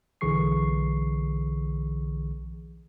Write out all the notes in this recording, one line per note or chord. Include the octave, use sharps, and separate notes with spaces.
B1 D3 E3 G#4 C#6 C7